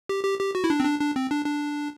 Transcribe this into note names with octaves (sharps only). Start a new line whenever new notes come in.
G4
G4
G4
F#4
E4
D4
C4
D4
D4
C4
D4
D4